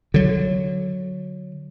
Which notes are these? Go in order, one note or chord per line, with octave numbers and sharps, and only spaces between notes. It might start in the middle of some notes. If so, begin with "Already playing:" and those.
D3 F#3